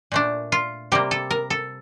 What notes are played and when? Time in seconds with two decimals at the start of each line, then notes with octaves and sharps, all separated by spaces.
0.12 A#2 A3 D4
0.52 F4
0.92 C3 G3 A#3 G4
1.11 A4
1.31 A#4
1.50 A4